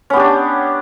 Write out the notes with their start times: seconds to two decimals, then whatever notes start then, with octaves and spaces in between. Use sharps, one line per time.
0.10 C#4
0.13 B3
0.16 G4
0.19 D4